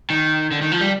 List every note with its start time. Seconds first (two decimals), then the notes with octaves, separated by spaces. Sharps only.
0.10 D#3
0.51 D3
0.61 D#3
0.72 F3
0.81 G3